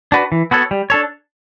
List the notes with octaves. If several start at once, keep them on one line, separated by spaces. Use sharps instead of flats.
D4 F#4 B4
E3
B3 F#4 A4 C#5
G3
D4 A4 C#5